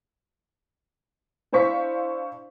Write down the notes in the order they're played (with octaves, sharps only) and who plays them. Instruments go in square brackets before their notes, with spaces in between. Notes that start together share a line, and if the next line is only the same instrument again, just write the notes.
[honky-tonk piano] D4 E4 C5 F5 C#6 B6